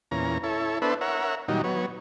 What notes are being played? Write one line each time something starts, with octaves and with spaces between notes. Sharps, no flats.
E2 A#2 C#4 A#5
E4 A4 C#5
B3 D4 A4 B4 C5 E5
A#4 C#5 E5 F#5
A#2 D#3 F#3 G3 D#4
F#3 B3 C#5